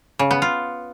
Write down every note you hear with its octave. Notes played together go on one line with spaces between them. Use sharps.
C#3
B3
F4